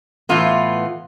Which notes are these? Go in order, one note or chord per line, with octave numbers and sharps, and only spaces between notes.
A2 E3 B3 F4